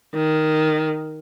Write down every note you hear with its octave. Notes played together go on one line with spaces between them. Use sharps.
D#3